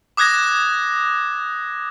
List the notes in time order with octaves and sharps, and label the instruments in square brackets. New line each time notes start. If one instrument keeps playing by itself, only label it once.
[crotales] D6 D#6 F#6 G#6 A#6 E7